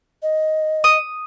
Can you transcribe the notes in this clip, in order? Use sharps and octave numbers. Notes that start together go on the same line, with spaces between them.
D#5
D#6